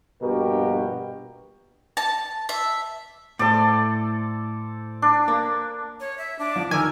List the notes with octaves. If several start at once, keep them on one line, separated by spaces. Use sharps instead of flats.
A#1 G2 B2 F#4 G4 A#4
A5
E5
A2 A4 C5 D5
D4
A#3
C#5
E5
D4
F3
D#3 A#4 G#5 D6 E6